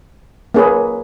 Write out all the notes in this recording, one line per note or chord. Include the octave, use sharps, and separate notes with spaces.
A#3 C#4 G#4 B4